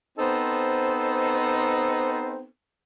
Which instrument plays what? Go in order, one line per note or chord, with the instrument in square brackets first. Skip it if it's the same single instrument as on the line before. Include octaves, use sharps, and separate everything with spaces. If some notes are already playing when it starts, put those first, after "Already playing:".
[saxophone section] B3 C4 D#4 A4 C5